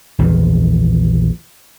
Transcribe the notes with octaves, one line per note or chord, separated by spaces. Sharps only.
A#1 E2 D#3 E3